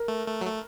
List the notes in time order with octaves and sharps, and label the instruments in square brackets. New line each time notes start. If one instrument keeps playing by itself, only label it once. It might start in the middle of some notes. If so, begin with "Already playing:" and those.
Already playing: [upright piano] A#4
[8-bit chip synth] A3
A3
F#3
A3